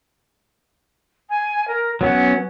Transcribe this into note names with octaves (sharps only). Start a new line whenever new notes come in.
G#5
A#4
F#3 B3 C#4 F#5